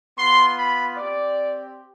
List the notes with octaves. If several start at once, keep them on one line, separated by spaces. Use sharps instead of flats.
B3 F4 C6
B5
C4 G4 D5